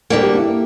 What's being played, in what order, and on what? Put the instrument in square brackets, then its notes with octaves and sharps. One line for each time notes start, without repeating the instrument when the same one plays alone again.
[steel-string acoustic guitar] D2 D3 G3 A#3 [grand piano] A4
[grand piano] G4
E4
A#3